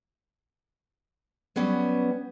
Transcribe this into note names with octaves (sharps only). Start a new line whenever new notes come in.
F#3 G3 B3 C#4